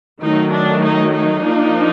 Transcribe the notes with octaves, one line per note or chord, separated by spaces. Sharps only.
D#3 F#3 A3 D#4
D4
D#4
D#4
F3 A#3 D4